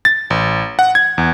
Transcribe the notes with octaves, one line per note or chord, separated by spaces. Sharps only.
A6
A1
F#5
G#6
E2